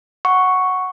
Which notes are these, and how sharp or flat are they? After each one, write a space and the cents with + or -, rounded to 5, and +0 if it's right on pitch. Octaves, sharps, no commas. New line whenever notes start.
F#5 +0 C#6 +0